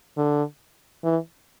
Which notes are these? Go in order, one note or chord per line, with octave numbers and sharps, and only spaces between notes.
D3
E3